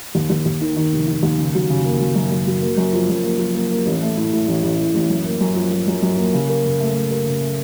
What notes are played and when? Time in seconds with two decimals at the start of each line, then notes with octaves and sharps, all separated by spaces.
0.15 D#2
0.30 D#2
0.46 D#2
0.61 D#3
0.76 D#3
0.93 F1
1.08 D#3
1.23 D#2
1.38 C#3
1.55 F#3
1.70 C#3
1.85 A#3
2.01 F#3
2.15 F#2
2.32 F#2
2.47 F#3
2.62 A#3
2.77 F#2
2.93 F3
3.09 F#2
3.24 A#3
3.39 F3
3.55 A#3
3.71 A#3
3.86 A1
4.02 A3
4.17 A2
4.33 A2
4.48 A1
4.63 A1
4.79 A2
4.94 A1
5.10 F#2
5.25 A#3
5.41 F#2
5.56 F3
5.72 F#2
5.88 F#2
6.02 F#2
6.17 A#3
6.33 C#3
6.49 A#4
6.64 C#3
6.80 A3
6.95 A3
7.11 A#4
7.26 C#3
7.41 A3